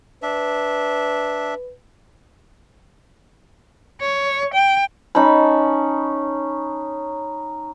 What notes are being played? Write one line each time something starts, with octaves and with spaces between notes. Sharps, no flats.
D4 B4 E5
C#5
G5
C#4 D#4 A5 B5